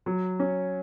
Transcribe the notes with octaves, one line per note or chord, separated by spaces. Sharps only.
F#3
C#4